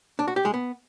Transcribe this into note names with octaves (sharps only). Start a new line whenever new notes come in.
D4
F#4
G4
G#3
B3